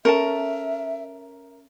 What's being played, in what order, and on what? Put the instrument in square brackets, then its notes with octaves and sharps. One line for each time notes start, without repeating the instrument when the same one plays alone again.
[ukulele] C#4 A4 A5 [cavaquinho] A#4 [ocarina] E5